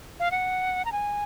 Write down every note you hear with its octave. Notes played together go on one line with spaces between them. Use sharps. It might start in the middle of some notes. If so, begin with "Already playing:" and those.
F5
F#5
A#5
G#5